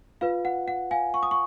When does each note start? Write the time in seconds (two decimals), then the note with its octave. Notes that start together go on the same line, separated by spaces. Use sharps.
0.21 F4 B4 F5
0.45 F#5
0.68 F#5
0.91 F5 G#5
1.14 C#6
1.23 D#6
1.31 C#6